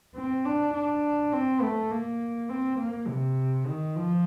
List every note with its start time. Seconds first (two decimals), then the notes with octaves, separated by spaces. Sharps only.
0.15 C4
0.45 D4
0.74 D4
1.33 C4
1.62 A3
1.91 A#3
2.49 C4
2.79 A#3
3.08 C3
3.67 D#3
3.95 F3